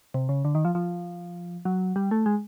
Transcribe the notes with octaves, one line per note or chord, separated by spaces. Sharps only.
C3
C#3
D3
D#3
F3
F3
F#3
G3
A3
G#3